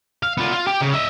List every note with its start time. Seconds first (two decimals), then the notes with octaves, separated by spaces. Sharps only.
0.23 F5
0.38 B3 F4
0.53 F4
0.67 G4
0.81 C#3
0.93 D#5 E5